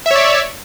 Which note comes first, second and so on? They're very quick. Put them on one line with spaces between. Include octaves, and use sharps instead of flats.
E5 C#5 D5